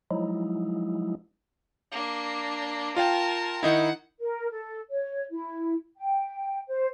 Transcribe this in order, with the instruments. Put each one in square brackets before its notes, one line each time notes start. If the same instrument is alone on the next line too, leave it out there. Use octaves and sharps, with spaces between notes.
[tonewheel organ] F3 F#3 G#3 D#4 E4
[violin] A#3 D4
[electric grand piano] F4 F5 G5 [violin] A#4 A5
[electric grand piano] D#3 D#4 E4 [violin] F#5
[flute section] A#4
A4
C#5
E4
G5
C5